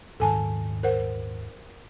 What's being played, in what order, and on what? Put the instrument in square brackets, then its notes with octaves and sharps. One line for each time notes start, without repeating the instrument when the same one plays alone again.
[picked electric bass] D#1 G#2 D#3 [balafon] A4 G#5 A5
[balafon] A#4 C5 F#5